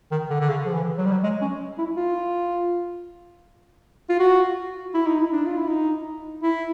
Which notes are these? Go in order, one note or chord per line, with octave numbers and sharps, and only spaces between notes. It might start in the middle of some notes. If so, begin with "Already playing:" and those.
D#3
D3
D3
C#3
F3
E3
F#3
G3
F#3
G#3
C#4
E4
F4
F4
F#4
E4
D#4
E4
D4
F4
E4
D#4
E4